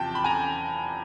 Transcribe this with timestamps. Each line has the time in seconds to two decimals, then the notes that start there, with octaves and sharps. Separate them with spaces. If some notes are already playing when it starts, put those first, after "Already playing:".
Already playing: E2 C3 F3 G5 A5
0.15 B5
0.24 G#5 A#5